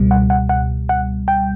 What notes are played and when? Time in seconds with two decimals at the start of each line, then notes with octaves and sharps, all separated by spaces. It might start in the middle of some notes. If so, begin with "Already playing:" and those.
Already playing: C#2 B2 G3
0.11 F#5
0.30 F#5
0.49 F#5
0.89 F#5
1.28 G5